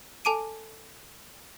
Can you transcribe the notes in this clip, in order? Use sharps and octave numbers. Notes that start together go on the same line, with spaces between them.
A4 G#5 A5 D6 D7 D#7